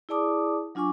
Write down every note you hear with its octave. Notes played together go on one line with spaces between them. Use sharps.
E4 G#4 D5 A5 D6 D#6
F#3 D4 F4 G#5 C#6 D6